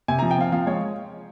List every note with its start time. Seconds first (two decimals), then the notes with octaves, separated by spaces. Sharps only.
0.08 C3 G#5
0.19 F3 A#5
0.31 G5
0.38 C4 F5
0.52 F3 F5
0.66 G#3 C#5